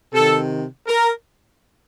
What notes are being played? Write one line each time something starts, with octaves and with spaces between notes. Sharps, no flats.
C3 D#3 A4
A#4